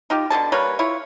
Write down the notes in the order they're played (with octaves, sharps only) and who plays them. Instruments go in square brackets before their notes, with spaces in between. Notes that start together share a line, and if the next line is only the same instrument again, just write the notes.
[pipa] D#4 F4 G4
B2 D3 G#4 A5
G3 A#3 B4 C#5
E4 F4 C#5